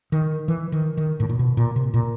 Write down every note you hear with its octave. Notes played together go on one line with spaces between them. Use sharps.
D#3
E3
D#3
D#3
A2
A#2
B2
A#2
C3
A#2